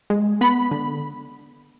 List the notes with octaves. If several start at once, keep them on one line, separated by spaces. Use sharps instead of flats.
G#3
B3 B5
D3